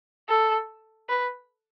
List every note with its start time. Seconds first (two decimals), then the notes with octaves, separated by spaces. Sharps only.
0.29 A4
1.09 B4